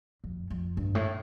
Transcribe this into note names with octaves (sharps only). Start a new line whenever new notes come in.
F2
F2
G2
A2